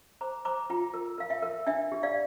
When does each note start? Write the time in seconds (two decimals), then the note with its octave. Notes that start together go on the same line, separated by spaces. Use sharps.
0.21 C5 A#5 D6
0.45 C5 A#5 D6
0.70 F4 G5 A#5
0.94 A#4
1.18 A#4 F5
1.30 E5 G5
1.42 A#4
1.67 D4 E5 G5
1.92 G4
2.03 D5 F5